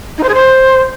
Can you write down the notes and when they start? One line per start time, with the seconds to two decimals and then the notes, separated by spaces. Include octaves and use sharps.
0.18 D#4
0.23 C5
0.29 G#4
0.34 C5